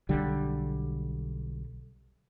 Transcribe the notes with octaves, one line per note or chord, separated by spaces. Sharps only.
B1 D3 G3